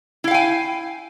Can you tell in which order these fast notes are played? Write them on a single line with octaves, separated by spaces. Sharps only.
E4 F5 G5 G#5